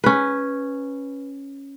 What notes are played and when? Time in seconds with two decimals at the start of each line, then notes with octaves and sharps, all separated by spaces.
0.04 C#4 B4